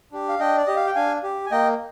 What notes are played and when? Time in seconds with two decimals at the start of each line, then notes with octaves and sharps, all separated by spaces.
0.12 D4 G4
0.29 F5
0.39 D4 D#5 G5
0.57 D5
0.66 G4 D#5
0.76 F5
0.86 G5
0.95 D4 F5 G#5
1.23 G4
1.46 G#5
1.51 A#3 D#5 G5